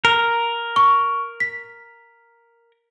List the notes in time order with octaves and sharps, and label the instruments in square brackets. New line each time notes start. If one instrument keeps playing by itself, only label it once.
[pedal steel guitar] A#4
[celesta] C#6
B6